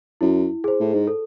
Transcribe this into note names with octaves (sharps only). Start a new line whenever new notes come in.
F#2 E4
G#4 C5
A2
G#2
A4